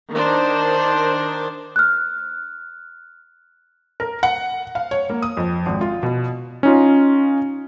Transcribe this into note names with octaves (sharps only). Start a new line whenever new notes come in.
D#3 D4 C5
F6 F#6
A#4
F#5
F5
C#5
A#3
D#6
F2
G#1
F4
B2
C#4 D#4 F4